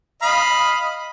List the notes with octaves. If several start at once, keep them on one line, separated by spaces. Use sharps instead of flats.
D#5 F5 B5